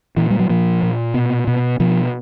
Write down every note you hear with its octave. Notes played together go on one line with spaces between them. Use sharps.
A#2 E3
G3
F#3
A#2 F3
A#2
B2
B2
B2 F3